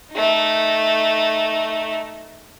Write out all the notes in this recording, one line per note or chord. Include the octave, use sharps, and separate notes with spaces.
A3 D#4